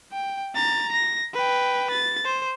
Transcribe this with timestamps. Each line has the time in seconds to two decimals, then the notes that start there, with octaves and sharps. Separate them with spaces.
0.12 G5
0.55 A#5 A6
0.92 A#6
1.34 B4 G5
1.91 A6
2.25 C5